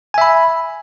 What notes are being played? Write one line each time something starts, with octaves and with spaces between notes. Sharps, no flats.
E5 G#5 B5